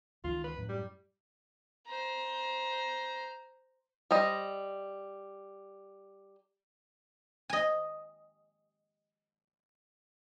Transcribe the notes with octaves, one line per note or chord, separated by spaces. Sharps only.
C#2 D#3 E3 F4
B4
F#2 A2 F#3
G3
C5 A#5
G3 C5 D#5
D#5 G#5